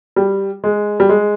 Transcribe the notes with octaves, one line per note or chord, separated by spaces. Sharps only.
G3
G#3
G3
G#3